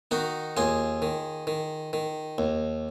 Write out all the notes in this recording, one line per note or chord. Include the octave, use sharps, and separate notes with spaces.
D#3 D#4 F#4
D#2 F4 G#4
D#3
D#3
D#3
D#2